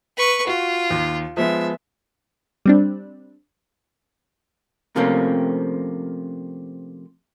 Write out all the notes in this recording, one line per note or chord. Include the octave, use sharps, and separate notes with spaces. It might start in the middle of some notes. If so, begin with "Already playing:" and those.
B4 C#6
F4 F#4
D#2
F3 G#3 B3 E5
G3 C4 D4
C3 F3 A3 A#3 C4 C#4